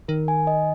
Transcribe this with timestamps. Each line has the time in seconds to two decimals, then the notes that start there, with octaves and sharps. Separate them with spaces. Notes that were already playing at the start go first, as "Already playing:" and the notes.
0.08 D#3 A#4
0.28 G#5
0.47 D#5